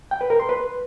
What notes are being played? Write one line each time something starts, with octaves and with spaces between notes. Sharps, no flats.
G5
B4
A#4
C6
B4